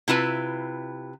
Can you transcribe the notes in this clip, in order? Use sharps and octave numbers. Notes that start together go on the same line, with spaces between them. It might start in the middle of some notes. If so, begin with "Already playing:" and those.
C3 E4 F4 B4